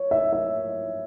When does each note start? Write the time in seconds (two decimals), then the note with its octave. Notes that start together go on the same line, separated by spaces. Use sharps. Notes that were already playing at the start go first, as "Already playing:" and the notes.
Already playing: C#5
0.11 E5
0.33 E5